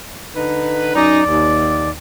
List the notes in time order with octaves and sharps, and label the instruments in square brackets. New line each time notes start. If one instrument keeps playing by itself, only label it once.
[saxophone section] D3 D#4 B4
[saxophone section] F#2 C#4 D#4 [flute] D5
[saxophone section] D#2